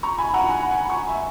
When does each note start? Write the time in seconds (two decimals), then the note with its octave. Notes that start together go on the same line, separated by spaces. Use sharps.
0.03 A#5 C#6
0.18 G#5 B5
0.29 B5
0.34 F#5 A#5
0.49 G#5 B5
0.71 G#5 B5
0.90 C#6
0.94 G#5 B5
1.09 E5 G#5